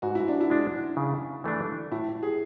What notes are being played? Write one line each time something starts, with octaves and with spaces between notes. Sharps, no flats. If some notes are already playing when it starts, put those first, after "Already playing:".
G#2 F#4
E4
D4
E4
G#3 D4
C#3
E3 A3 D4
A2 E4
G#4